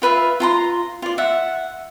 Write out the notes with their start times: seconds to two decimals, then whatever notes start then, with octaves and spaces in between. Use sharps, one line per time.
0.02 F4 B4 E5 F5
0.40 F4 A#5 C6
1.02 F4 D5
1.18 E5 F#5